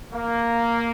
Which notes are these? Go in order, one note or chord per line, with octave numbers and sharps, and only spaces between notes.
A#3